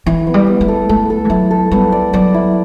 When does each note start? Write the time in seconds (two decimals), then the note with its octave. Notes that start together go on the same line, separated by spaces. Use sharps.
0.06 E3 E4
0.27 B3
0.34 G3
0.47 B3
0.61 A3
0.68 A4
0.89 A3 A4
1.10 A4
1.25 E3
1.30 F#3 E4
1.51 A4
1.71 G3 B3
1.92 D5
2.13 F#3 D5
2.34 E4